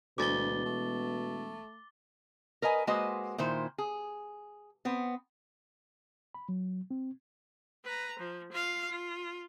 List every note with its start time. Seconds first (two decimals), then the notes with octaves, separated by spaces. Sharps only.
0.18 E1 D2 B2 D6 A6 G7
0.65 A3
2.62 A#4 B4 D#5 G#5
2.87 G#3 A#3 F#4 B4 C5 D#5
3.38 A#2 D#3 E4 C5
3.78 G#4
4.85 B3 C4
6.35 B5
6.49 F#3
6.91 C4
7.85 B4 A#5
8.19 F3
8.52 F4 F5
8.90 F4